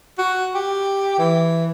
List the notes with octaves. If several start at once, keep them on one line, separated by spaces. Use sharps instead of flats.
F#4
G4
E3